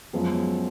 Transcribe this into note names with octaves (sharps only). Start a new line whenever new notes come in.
F#2 F3 G#3 B3